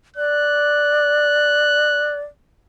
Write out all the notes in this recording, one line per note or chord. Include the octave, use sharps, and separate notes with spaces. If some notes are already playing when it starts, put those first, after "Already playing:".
D5 F#6